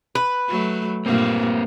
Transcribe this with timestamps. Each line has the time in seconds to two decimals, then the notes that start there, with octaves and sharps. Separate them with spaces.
0.15 B4
0.48 F#3 A3
1.06 G2 A#2 A#3 C4